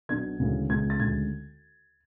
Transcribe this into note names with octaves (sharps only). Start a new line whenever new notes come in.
B1 B2 F#3 B3 D4 G#6
D2 C#3 E3 G#3 B3
C#2 C#3 G#3 B3 G#6
A6
D2 C#3 G#3 G#6